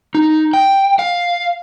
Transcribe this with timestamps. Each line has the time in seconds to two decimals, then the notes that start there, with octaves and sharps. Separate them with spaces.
0.15 D#4
0.53 G5
0.99 F5